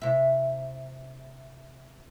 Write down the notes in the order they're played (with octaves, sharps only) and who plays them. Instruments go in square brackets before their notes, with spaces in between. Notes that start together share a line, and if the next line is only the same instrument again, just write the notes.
[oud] C3 E5